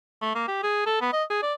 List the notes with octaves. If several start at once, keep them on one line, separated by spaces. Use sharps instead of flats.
A3
A#3
G4
G#4
A4
B3
D#5
G#4
D5